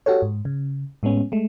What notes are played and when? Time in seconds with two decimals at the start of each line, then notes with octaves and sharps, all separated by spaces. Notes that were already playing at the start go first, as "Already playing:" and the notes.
0.06 F#4 G4 A4 C#5
0.22 G#2
0.45 C#3
1.03 A2 G#3 B3 C#4
1.32 G#3 A3